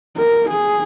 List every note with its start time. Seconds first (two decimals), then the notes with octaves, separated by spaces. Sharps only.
0.17 A#4
0.51 G#4